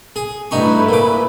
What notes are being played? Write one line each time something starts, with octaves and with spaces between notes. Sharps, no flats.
G#4
G2 A3 D#4 E4 B4 C#6
A#2 D6